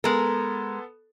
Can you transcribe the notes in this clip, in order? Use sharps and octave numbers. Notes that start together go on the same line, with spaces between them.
G#3 B3 A4 A#4